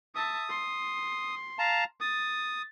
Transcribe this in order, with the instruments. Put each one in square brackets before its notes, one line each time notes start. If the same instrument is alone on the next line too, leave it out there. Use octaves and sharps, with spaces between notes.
[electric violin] E5 A5 [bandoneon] D#6
[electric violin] C6
[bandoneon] F5 A5 A#5
[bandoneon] D#6 [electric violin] A6